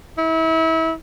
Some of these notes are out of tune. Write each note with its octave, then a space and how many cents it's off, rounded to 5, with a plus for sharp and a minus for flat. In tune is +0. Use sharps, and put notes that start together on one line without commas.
E4 -30